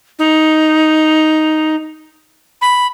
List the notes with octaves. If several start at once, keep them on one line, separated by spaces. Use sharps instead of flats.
D#4
B5